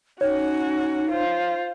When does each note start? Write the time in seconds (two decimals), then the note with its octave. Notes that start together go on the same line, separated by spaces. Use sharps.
0.21 C#4 D#4 F#4 C#5
1.09 F4 C5